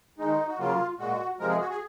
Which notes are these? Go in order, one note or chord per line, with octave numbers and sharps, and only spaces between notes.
D#3 G#3 D#4
F#4
C#3 F#3 A#3 F4
A#2 G#3 F#4
C3 F3 G#3 A#4
G#4
F#4
G#4